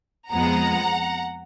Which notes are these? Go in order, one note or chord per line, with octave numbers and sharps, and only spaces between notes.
F2 F3 G#3 B3 F#5 A#5